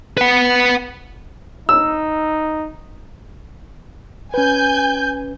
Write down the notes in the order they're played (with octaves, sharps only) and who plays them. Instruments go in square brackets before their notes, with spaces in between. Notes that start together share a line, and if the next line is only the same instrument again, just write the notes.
[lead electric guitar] B4 F#5
[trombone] D#4 [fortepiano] E6
[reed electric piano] C#4 B4 [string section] G#5 G6